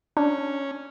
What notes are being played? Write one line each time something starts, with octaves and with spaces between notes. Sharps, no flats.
C#4 D4